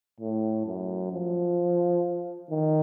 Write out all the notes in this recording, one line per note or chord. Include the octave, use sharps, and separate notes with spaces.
A2
F#2
F3
D#3